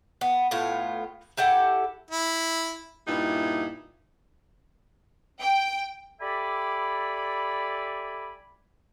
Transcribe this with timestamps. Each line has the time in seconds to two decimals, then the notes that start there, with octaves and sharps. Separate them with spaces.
0.21 B3
0.51 A2 B3 F4
1.37 E4 G4 A4 F#5
2.11 E4
3.08 G2 A#2 D#4 E4
5.39 G5
6.21 G4 A4 D5 E5 G#5 B5